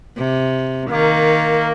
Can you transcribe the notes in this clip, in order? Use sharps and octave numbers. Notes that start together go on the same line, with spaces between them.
C3
D#3 A#3